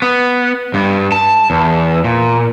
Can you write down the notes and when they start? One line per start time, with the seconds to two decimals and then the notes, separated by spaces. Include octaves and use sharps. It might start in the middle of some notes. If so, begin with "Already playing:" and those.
0.02 B3
0.74 G2
1.12 A5
1.50 E2
2.04 A#2